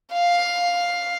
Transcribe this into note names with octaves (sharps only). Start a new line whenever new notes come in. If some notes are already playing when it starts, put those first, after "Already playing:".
F5